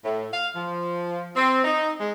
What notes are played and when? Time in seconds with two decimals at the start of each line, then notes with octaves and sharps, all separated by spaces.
0.05 A2
0.32 F5
0.56 F3
1.36 C4
1.64 D#4
2.01 G#3